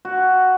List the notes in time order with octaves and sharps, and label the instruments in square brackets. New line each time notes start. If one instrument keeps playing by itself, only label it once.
[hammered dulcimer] F#4